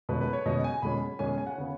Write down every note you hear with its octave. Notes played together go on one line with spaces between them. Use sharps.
B2 G#3 C#4 B4
B4
C#5
B2 G#3 C#4 D#5
G#5
B2 G#3 C#4 B5
B2 G#3 C#4 G#5
G#5
F#5
C#3 B3 C#5